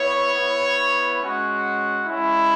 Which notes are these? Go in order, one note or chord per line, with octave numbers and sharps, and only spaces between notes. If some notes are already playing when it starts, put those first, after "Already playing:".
Already playing: B3 E4 C#5
B3 E4
G#3 C#4 F#4
G#3 C#4 E4